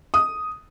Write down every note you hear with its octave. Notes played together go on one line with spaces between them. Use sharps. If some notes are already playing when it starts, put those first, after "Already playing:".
D#6